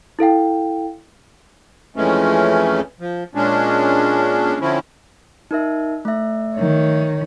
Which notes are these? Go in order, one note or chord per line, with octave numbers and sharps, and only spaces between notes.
E4 A4 F5 G5
F2 E3 G#3 A3 C#4
F3
A#2 G#3 C#4 D4
D3 F3 C4 C#4 E4
D#4 A#4 E5
A3 E5
D#3 C#5